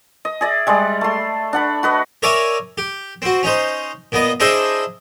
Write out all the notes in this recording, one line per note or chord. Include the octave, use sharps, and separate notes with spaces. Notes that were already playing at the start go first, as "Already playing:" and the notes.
D#5
G#4 D5 E5
G3 G#3 D5
A3 C6
D4 F#5 B5
F#4 B4 D#5
A#4 C#5 D5 E5 G#5
G4
C4 F#4
C#4 D#4 C5
A#2 B3 D#5
D4 E4 G#4 C5 D#5 E5